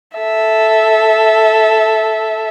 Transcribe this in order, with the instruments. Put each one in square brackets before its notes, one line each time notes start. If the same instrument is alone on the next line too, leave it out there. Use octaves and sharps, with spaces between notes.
[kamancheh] A4 E5